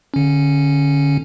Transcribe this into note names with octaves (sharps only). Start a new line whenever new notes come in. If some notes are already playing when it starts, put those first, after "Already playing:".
D3 C#4